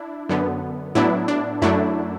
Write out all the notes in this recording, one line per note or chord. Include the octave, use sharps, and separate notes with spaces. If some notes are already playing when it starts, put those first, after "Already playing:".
Already playing: D4 E4
F#2 D3 B3
A2 F#3 B3 D4 E4
D4
F#2 F#3 A3 D4 E4